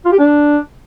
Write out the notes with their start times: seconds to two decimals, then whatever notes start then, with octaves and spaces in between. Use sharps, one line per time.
0.05 F4
0.12 G4
0.19 D4